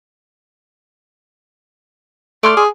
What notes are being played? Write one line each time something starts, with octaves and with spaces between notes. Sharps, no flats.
A3 D5 C6 F6
G#4